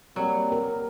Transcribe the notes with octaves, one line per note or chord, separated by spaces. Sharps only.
F#3 G3 A#3 C4
A#4